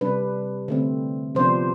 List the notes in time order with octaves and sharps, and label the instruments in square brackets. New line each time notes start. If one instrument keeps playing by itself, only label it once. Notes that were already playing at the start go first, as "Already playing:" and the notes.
[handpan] C3 G3 D4 B4
D3 A3 C4
C3 F3 B3 D4 C5